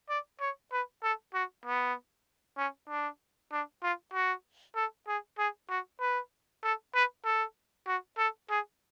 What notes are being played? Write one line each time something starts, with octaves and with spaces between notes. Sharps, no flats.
D5
C#5
B4
A4
F#4
B3
C#4
D4
D4
F4
F#4
A4
G#4
G#4
F#4
B4
A4
B4
A4
F#4
A4
G#4